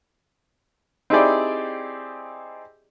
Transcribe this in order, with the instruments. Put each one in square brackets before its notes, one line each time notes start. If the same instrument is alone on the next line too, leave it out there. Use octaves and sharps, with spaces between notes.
[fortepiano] C4 D#4 E4 G4 G#4 D5